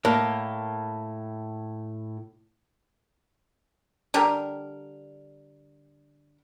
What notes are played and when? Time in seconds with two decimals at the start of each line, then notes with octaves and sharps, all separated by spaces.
0.05 A2 A#3
4.14 D3 G3 G4 A#4